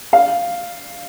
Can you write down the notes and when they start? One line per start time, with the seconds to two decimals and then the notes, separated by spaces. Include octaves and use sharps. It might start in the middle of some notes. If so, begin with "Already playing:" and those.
0.13 F5